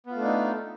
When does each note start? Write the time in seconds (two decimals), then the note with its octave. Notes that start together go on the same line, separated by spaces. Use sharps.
0.06 B3
0.11 F4
0.15 A3
0.20 D4
0.24 D#4